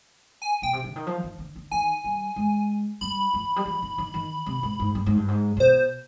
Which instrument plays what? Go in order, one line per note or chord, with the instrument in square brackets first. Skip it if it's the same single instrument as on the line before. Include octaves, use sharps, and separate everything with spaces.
[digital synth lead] G#5
[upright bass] B2 [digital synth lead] G5
[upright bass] C3
D3
D#3
F3
D#3
D3
D3
[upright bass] D#3 [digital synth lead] G#5
[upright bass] G3
G#3
[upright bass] G3 [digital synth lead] B5
[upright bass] F3
G3
F3
D#3
D#3
D#3
C3
G#2
G#2
G2
G#2
G2
G#2
C3
[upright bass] B2 [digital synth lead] C5